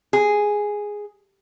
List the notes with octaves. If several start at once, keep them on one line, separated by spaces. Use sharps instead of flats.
G#4